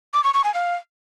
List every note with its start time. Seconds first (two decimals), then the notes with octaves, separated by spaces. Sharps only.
0.14 D6
0.24 C#6
0.34 C#6
0.44 G#5
0.54 F5